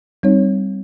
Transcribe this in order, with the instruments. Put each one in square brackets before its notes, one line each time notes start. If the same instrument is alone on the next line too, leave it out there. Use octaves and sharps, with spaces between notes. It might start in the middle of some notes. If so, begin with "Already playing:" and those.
[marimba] G3 C4 D#4 C#5